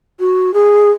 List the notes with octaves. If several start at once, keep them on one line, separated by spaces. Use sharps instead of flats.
F#4
G#4